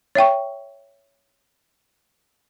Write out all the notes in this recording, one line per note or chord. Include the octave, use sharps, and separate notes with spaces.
C#5 E5 G5 C#6